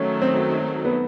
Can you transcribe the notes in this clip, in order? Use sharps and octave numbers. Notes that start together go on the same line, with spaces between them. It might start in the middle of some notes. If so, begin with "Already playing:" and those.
Already playing: D#3 F#3 A3 C#4
C4
B3